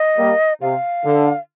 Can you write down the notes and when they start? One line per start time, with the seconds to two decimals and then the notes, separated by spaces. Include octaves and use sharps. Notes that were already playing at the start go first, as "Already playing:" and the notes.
Already playing: D#5
0.18 G3 A#3
0.62 C3 F5
1.05 D3